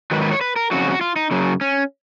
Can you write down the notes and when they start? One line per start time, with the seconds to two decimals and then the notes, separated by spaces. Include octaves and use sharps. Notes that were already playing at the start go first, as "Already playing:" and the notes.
0.11 G#2 D#3 F#3 B4
0.22 B4
0.31 C#5
0.41 B4
0.56 A#4
0.71 F2 C#3 F#3 F#4
0.90 F#4
1.01 F4
1.16 D#4
1.31 F#2 C#3 F#3
1.61 C#4